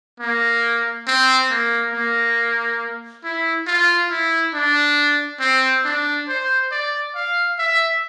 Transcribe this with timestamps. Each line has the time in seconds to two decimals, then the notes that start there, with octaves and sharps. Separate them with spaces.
0.20 A#3
1.08 C4
1.51 A#3
1.94 A#3
3.24 E4
3.67 F4
4.11 E4
4.54 D4
5.40 C4
5.85 D4
6.28 C5
6.72 D5
7.15 F5
7.59 E5